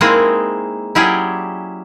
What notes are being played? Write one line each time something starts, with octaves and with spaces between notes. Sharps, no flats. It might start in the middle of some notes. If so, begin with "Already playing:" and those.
G#3 A#3 C4 D#4 E4 G#4
F#3 C#4 E4 G4 G#4 D5